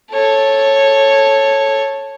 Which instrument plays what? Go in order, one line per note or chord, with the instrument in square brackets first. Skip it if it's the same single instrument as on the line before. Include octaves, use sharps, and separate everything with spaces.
[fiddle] A4 C#5